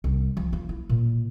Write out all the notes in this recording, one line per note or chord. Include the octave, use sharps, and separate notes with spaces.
C2
F3
F4
E4
A#2